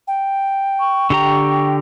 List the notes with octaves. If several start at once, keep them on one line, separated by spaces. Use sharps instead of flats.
G5
C#6
D3 G4 G5 A#5